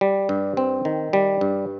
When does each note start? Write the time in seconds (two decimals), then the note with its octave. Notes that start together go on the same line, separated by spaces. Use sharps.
0.01 G3
0.29 G2
0.57 C4
0.85 D#3
1.13 G3
1.41 G2